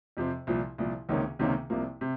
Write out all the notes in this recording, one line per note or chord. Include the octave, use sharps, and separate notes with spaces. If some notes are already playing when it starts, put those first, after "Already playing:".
F2 C3 F3 C4
C2 A#2 F3
C2 A#2 F3
C#2 C3 D#3 A#3 C#4
C#2 C3 D#3 A#3 C#4
C2 C3 F3 A#3
C3